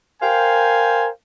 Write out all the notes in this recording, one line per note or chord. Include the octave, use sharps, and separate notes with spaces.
A#4 C5 F5 G5 G#5